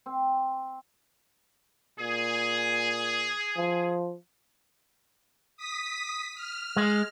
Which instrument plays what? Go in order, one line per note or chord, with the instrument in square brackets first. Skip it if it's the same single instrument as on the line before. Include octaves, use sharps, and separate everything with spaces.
[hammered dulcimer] C4
[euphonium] A#2 [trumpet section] G#4
[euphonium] F3
[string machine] D#6 B6
F6
[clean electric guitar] G#3